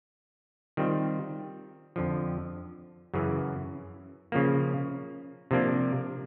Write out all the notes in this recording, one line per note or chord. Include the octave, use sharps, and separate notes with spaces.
D#3 G3 C4 F4
F2 D3 F3
F#2 C#3 E3
C#3 F3 A#3
C3 F3 A#3 D4